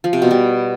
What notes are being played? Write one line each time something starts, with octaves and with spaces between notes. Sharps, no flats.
F3
C3
B2
G3